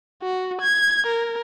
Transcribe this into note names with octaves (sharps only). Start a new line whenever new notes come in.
F#4
G#6
A#4